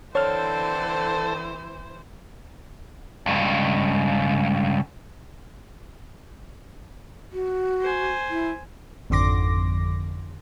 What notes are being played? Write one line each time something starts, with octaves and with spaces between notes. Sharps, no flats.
D3 E3 C4 A4 C5 C#5 A5 F6
C#2 G2
F#4
C5 G#5
E4
G#1 F2 D3 C6 D6 A#6